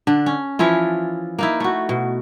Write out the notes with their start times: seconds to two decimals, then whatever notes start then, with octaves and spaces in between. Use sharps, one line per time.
0.07 D3 D4
0.26 C#4
0.59 E3 F3 E4 F4
1.39 A#3 D#4 E4
1.60 A3 F#4
1.89 B2